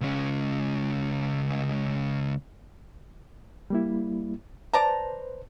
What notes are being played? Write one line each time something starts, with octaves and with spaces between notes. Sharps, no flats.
C#2 C#4
G3 A#3 E4
B4 C5 D5 A5 A#5